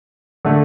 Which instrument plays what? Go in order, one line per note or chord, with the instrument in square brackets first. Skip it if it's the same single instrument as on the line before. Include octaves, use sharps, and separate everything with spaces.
[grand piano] D3 A3